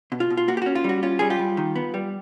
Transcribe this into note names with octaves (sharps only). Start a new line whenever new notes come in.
B2
F4
B2
F4
A#3 F#4
G4
C#4 F#4
F4
G3 F#4
C#4 F4
G3 G#4
F4 G4
G3
D#3
B3
G3